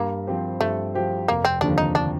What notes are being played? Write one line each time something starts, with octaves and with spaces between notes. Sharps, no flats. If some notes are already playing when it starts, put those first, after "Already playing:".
Already playing: G2 A#3
F3 C4 G4 C5
G2 A3
F3 C4 G4 C5
F1 A#3
C4
D#2 D3 F3 D4
D#4
D4